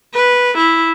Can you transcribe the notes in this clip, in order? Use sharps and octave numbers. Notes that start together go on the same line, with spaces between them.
B4
E4